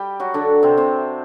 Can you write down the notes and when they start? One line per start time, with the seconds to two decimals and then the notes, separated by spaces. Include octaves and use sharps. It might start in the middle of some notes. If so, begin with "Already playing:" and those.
Already playing: G3 G4
0.20 F#3 F#4
0.34 D3 D4
0.63 C3 C4
0.78 C3 C4